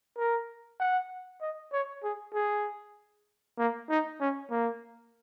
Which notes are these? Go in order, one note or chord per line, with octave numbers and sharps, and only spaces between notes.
A#4
F#5
D#5
C#5
G#4
G#4
A#3
D#4
C#4
A#3